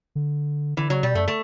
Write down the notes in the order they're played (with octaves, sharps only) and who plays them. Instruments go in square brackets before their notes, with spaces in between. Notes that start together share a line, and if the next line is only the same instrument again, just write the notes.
[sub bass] D3
[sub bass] D3 [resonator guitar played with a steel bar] E3
[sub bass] C#3 [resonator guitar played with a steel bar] F#3
[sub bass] B2 [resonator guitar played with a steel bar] G3
[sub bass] F#2 [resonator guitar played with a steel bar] A3
[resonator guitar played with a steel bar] A3